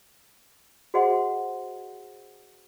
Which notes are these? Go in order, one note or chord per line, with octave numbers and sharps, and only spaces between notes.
F#4 G#4 C5 D#5 F#5 C6